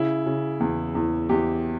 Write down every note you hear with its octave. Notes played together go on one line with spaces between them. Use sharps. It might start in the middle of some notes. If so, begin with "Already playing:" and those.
Already playing: C#3 E4
C#3
E2
E2
E2 G4